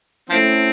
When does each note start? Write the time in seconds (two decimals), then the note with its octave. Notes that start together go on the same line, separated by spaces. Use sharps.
0.30 F3 A3 C4 C#4 E4